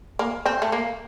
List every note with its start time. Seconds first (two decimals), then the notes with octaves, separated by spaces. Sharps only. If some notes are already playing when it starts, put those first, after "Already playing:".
0.19 A#3
0.46 C4
0.62 A3
0.72 A#3